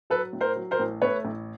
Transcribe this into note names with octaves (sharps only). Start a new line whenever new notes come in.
F#3 A4 B4
A2
A#4 C5
F#3
A#4 C5
A1
A3 B4 C#5
A1